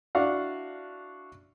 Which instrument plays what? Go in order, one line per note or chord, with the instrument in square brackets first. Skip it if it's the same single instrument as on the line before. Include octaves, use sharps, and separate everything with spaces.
[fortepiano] D4 E4 F#4 D5 F5 F#5